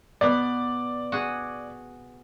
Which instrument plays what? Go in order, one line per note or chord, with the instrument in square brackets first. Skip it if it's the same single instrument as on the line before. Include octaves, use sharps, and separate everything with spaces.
[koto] B2 B3 [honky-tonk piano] D5
[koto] F#4 G#4